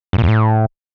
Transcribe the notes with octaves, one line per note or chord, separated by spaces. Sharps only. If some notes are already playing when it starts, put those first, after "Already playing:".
F#2
A#2
E2
A2